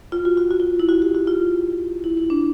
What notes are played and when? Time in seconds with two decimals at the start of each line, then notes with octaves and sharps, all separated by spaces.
0.12 F4
0.25 F#4
0.37 F#4
0.51 F#4
0.60 F4
0.80 E4
0.89 F#4
1.02 G4
1.15 F#4
1.27 F4
2.04 E4
2.17 E4
2.30 D4